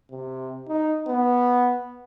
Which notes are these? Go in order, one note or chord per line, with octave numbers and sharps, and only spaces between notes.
C3
D#4
B3